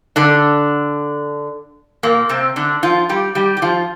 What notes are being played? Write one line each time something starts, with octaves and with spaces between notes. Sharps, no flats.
D3 D4
A#2 A#3
C3 C4
D3 D4
F3 F4
G3 G4
G3 G4
G4
F3 F4